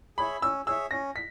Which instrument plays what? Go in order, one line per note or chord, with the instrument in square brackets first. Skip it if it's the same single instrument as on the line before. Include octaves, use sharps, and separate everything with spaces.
[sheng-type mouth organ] G#4 C#5 E5 [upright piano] B5
[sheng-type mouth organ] C#4 [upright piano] E6
[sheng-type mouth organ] G#4 C#5 E5 [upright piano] E6
[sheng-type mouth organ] C#4 [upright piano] A#6
[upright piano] B6